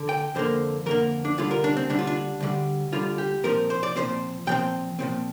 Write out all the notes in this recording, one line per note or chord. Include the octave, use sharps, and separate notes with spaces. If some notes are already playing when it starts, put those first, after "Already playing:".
Already playing: D3
G5
F2 D3 A#3 C5
F2 D3 A#3 A#4
D4
D2 D3 G3 F4
A#4
D4
C4
D2 D3 G3 D4
F4
D4
D2 D3 G3
D2 D3 G3 F4
G4
A#2 F3 C4 A#4
C5
D5
A#2 F3 C4 C5
A#2 F3 C4 G5
A#2 F3 C4